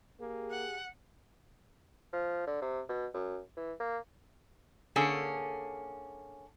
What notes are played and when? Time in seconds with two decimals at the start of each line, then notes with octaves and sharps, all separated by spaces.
0.20 A#3 G4 G#4
0.51 F#5
2.13 F3
2.47 D3
2.62 C3
2.89 B2
3.14 F#2
3.57 E3
3.80 A#3
4.96 D3 A#3 C#4 G#4 A4